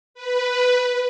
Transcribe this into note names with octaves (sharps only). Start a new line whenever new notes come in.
B4